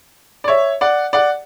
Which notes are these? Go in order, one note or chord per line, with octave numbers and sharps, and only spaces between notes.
D5
C#5 E5
D5 F#5
D5 F#5